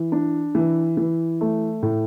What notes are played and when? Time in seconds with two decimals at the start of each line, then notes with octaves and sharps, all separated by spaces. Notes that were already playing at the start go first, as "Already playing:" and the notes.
Already playing: E3
0.12 D4
0.55 E3
0.97 E3
1.41 A3
1.83 A2